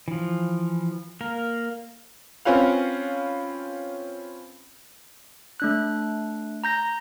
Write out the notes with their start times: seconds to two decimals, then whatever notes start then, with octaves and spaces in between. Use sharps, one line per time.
0.08 E3 F3
1.21 A#3 A#4
2.45 C4 C#4 F4 B4 F5
5.60 A3 D4 F#6
6.64 A#5 G6 A#6